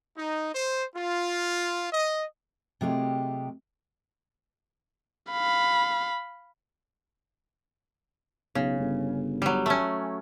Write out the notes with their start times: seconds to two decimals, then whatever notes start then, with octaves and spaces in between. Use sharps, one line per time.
0.17 D#4
0.54 C5
0.95 F4
1.92 D#5
2.81 C3 F#3 G#3 A3 F4 G4
5.31 F5 B5
8.55 B1 C#3
8.80 G1
9.42 F#3 G3
9.66 A3 C#4